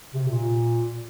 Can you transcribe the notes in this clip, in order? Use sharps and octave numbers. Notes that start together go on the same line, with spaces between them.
C3
A#2